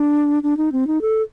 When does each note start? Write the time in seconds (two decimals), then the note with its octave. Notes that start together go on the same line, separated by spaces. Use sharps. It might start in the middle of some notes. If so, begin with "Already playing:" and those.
Already playing: D4
0.43 D4
0.57 D#4
0.72 C4
0.87 D#4
1.01 A4